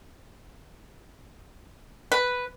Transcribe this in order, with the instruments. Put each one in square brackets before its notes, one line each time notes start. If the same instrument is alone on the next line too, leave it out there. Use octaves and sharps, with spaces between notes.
[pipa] B4